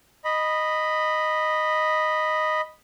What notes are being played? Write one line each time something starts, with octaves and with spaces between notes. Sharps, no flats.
D#5 B5